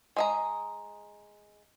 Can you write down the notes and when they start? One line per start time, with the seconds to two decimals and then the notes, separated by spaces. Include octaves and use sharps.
0.16 G#3 D#5 A#5